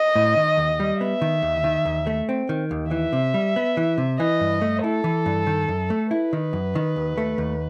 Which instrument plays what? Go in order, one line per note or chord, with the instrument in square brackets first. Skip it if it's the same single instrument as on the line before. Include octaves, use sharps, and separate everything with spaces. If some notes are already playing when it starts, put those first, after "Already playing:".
Already playing: [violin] D#5
[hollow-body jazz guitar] A2
D#3
D#2
G3
[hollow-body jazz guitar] B3 [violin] E5
[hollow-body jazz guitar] D#3
D#2
D#3
D#2
A3
C4
D#3
D#2
[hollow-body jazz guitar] E3 [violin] E5
[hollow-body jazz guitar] C3
G3
B3
E3
C3
[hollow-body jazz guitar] E3 [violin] D#5
[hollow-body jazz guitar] G2
A3
[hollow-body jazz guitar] E4 [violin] A4
[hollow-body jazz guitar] E3
G2
D#3
F#2
A3
[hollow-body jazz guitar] E4 [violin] B4
[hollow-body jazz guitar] D#3
F#2
D#3
D#2
A3
D#2